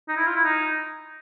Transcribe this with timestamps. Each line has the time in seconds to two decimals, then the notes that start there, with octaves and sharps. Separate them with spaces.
0.08 D#4
0.17 E4
0.26 F4
0.36 E4
0.44 D#4